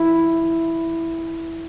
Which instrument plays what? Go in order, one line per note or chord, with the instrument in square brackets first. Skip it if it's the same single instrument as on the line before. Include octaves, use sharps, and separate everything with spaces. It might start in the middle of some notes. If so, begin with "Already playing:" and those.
Already playing: [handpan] E4